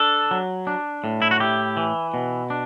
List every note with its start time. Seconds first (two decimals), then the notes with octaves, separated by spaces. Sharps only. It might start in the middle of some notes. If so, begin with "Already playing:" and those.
Already playing: D4 A4
0.31 F#3
0.67 D4
1.04 A2
1.22 E4
1.31 F#4
1.40 E4 G4
1.77 E3
2.14 B2
2.50 D4